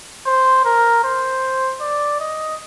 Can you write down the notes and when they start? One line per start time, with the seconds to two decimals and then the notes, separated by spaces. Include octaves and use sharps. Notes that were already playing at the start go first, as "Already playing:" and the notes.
0.26 C5
0.65 A#4
1.04 C5
1.81 D5
2.20 D#5